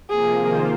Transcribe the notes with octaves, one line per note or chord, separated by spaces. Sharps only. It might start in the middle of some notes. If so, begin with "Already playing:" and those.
C3 F3 A#3 G#4
D#3 A#3 F4 C5